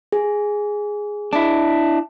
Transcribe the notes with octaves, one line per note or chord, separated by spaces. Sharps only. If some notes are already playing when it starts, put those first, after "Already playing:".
G#4
D4 E4